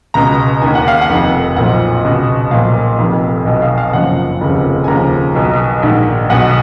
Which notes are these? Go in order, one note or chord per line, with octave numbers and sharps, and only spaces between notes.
C#2 B2 A#5
D#2 D#3 G#5
F#5
F5
F#5
F1 F2 D#3
B1 A#2 F3 F#5
C#2 B2
B1 A#2 F3 F5
F1 F2 D#3
B1 B2 D#5
F5
F5
F#1 F#2 F3 F#5
F1 D#2 C#3 F3
G#5
D#2 C#3 F3 A#5
B1 B2
A#1 G#2 D#3
B1 B2 F#5